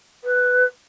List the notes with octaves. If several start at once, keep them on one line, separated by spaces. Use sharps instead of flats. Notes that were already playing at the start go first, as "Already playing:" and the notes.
B4